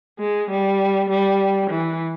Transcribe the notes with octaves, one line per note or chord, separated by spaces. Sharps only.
G#3
G3
G3
E3